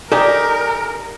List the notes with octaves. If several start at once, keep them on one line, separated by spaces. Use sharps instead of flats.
D#4 G4 A4 A#4 D5 G#5